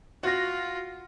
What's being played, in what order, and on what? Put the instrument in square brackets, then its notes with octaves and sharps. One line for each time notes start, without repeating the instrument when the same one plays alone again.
[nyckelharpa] F4 [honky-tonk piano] F#4 A#6